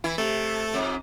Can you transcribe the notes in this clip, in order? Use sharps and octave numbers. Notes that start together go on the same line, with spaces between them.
E3 E4
C3 A3 A4
F2 G#2